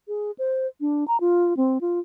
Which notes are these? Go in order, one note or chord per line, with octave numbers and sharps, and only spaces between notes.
G#4
C5
D4
A#5
F4
C4
F4